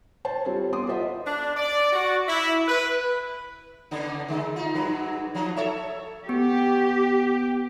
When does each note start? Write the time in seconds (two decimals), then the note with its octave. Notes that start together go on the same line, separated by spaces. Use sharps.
0.25 C5 C#5 A5
0.45 G3 C4 F4 A4 C#5
0.73 B3 C6 D6 D#6
0.87 F4 A4 C5 D#5 E5 F#5
1.26 D4
1.56 D5
1.93 F#4
2.29 E4
2.68 B4
3.91 C#3 B3 D4
4.28 D3 G#3
4.56 D#4 F4
4.75 G2 F#3 B4
5.35 F3 F#3 D#4
5.56 A4 C#5 E5
6.29 B3 G4